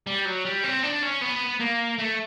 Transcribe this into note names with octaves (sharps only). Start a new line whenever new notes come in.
G3
F#3
G3
C4
D4
C#4
B3
A#3
A3